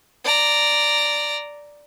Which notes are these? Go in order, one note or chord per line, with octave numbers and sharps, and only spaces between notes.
D5 A#5